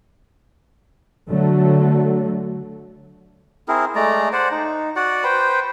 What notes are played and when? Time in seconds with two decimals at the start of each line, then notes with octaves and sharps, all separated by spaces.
1.29 D3 F#3 A3
3.68 C4 E4 G#4 A#4
3.95 G#3 A3 D5 A#5
4.33 C5 D5 F#5
4.51 D#4
4.96 F#4 D5 F#5
5.24 B4 C5 G5